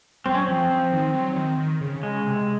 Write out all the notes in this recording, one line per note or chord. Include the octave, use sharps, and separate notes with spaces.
F#3 C4
C#4
C4
F3
F3
D#3
F#3
D#3
D#3
C#3
C#3 G#3
C3